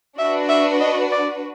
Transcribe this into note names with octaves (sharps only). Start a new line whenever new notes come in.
D4 F#4 B4 E5
E5
D#5
D5